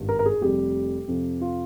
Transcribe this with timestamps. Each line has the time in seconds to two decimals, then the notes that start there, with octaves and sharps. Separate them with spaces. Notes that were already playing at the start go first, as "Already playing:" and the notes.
Already playing: G#1 G2 G3
0.09 A#4
0.19 A#4
0.26 G#4
0.41 F1 F2 C3 G3 G4
1.08 F2 C3 F3
1.42 F4